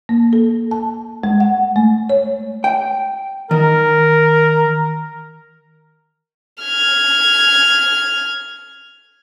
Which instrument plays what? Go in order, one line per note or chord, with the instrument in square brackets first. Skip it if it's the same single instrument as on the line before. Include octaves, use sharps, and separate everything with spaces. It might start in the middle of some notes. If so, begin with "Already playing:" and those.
[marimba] A#3
A4
A5
G#3
F#5
A3
C#5
[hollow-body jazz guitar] G5
[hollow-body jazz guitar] D#3 [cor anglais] A#4
[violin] F6 G#6